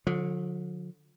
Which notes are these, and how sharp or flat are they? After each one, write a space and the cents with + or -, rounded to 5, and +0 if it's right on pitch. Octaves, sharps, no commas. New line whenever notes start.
D3 +0 F3 +45